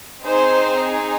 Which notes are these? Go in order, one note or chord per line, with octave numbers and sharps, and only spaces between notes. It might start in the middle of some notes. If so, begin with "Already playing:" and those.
C4 D#4 G#4 C5